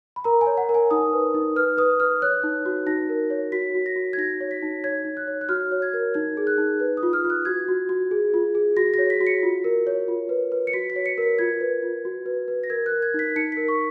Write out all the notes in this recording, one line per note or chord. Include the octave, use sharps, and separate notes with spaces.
B5
A#4 A#5
G#5
C#5
F#5
A#4
G#5
D#4 D#6
B4
D#4
B4 F6
B4 D#6
B4 F6
C#5 F#6
D#4
F#4
D#4 A#6
A#4
C#5
F#4 B6
F#4
A#6
F#4
G#6
D#4 A#6
C#5
B6
D#4
C#5 G#6
D#4
F#6
C#5
F#6
F#4 F6
C#5
G#6
A#4
D#4 G#6
G#4
F#6
D#4
B4
D#6
F4
F6
F4
F#6
F#4 G#6
F#4
F#4
G#4
F4
G#4
F#4 A#6
C#5 A#6
B6
F#4
C#7
F4
A#4
C#5
F4
B4
B4
C#7
F#4 B6
B6
C#5
C#7
A#4 B6
F4 G#6
B4
F4
F#4
B4
B4
A#6
A#4 G#6
F#6
A#4
G#6
D#4 B6
D#4 C#7
A#4 B6
C#6